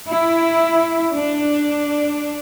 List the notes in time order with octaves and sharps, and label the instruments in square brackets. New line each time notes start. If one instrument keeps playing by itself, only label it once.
[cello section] E4
D4